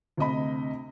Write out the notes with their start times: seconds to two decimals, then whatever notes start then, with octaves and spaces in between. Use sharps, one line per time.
0.17 D2 C3 D#5 B5